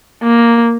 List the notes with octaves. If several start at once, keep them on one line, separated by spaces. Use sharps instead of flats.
A#3